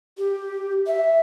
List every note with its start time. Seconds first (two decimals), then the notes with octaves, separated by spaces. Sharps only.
0.18 G4
0.87 E5